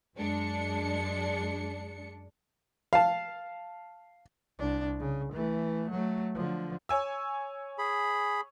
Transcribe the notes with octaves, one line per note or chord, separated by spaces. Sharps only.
F#2 G#3 D4 C#7
F5 A5
C2 D4
C#3
E3 A3
F#3 A3
D3 F3
C#5 G#5 E6
G#4 B5